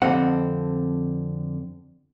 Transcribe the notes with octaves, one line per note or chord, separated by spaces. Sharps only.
F2 D3 C4 F#5